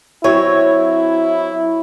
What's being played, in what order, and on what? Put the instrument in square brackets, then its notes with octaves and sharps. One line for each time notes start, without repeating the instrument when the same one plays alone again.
[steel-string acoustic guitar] F#3 C4 C#5 [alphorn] E4